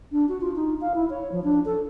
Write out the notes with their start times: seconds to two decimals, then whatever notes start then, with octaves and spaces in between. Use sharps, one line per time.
0.12 D4
0.29 F#4
0.41 F4
0.55 D#4
0.81 F5
0.95 E4
1.10 C#5
1.32 F3
1.44 D4
1.65 A4